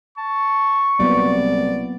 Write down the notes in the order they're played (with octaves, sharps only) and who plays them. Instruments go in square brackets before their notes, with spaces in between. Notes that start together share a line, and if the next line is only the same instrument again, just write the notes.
[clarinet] A5 [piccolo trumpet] C#6
[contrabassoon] C2 [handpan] F#3 A#3 B3 [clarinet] D5